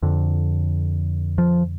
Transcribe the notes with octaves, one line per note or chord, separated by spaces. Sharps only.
F2 D3
F3